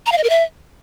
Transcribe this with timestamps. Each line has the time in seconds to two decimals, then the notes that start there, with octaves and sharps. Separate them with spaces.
0.06 A#5
0.12 F5
0.18 D#5
0.24 A#4
0.29 E5